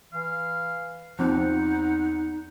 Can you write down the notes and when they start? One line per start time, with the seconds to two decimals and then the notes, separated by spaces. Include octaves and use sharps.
0.13 E3 F5
1.19 E2 F3 C4 D#4 F#5